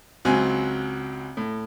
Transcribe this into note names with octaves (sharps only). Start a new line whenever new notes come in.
C#2 F#3 C4 G#5
A2